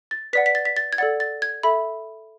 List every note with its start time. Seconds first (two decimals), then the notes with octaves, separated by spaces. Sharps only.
0.11 A6
0.33 B4 D5 F#5 B6
0.46 B6
0.55 A6
0.65 B6
0.77 A6
0.93 G#6
0.98 A4 D5 F#5 A6
1.20 A6
1.42 G#6
1.63 A4 E5 B5